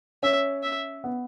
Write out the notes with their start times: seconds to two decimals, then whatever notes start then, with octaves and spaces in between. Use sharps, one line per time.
0.23 C#4 E5
0.63 E5
1.04 B3